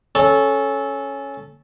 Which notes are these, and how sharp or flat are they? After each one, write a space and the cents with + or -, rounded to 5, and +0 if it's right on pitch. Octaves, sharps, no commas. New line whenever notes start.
C#4 +0 A4 -15